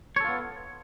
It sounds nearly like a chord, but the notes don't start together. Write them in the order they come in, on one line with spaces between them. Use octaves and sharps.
C#5 A4 F4 B3